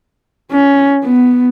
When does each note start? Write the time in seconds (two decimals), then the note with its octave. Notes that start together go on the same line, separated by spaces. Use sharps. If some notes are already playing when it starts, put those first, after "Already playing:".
0.51 C#4
1.05 B3